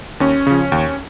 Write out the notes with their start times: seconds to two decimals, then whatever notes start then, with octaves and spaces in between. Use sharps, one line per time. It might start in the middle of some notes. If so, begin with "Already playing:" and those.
0.20 D#2 C#4
0.47 C#3 F3
0.72 D#2